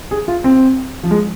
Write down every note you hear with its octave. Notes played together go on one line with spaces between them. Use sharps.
G#4
F4
C4
F3
G#3